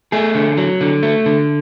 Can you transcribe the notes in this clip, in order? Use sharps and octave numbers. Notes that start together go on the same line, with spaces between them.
A3 G#4
D3
F#3
D3
A3
D3